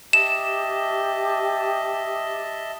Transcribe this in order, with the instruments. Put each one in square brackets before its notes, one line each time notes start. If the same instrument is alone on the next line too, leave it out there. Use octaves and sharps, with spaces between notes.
[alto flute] G4 [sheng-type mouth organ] D#5 E5 A5 [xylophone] E7